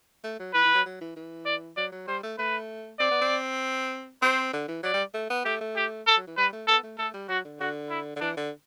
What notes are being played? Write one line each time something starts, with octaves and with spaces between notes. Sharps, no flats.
A3
F#3
E3 B4
E3
F#3
F#3
E3
E3
D5
F#3 D5
F#3
G3 C5
A3
A3 B4
C4 D5
B3
C4
C4 C5
D3
E3
F#3 D5
G3
A3
B3
A3 G4
A3
G4
A4
F#3
E3
G3 B4
A3
B3 A4
A3
A3 A4
G3
F#3 F#4
D3
D3 F#4
E4
D3
E3 D4
D3